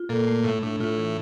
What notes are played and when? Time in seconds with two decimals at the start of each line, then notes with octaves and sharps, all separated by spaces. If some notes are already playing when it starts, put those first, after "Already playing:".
Already playing: F4
0.09 A#2 A4
0.27 A3
0.44 A2 A3
0.62 A2 D4
0.80 A2 F4
0.97 E3